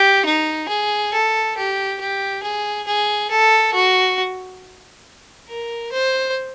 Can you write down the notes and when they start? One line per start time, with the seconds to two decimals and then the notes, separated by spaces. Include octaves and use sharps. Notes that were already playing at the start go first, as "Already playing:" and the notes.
Already playing: G4
0.25 D#4
0.69 G#4
1.13 A4
1.57 G4
2.01 G4
2.43 G#4
2.87 G#4
3.31 A4
3.74 F#4
5.49 A#4
5.92 C5